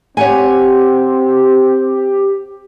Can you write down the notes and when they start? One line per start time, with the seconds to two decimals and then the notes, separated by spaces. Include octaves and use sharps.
0.17 C4 G4 C#5 F#5 G#5